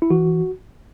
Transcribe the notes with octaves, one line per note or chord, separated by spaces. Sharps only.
E4
E3 F#4